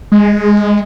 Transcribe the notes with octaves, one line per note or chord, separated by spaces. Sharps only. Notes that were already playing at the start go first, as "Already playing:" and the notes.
G#3